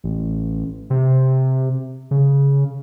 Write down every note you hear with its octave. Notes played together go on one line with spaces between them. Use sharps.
A1
C3
C#3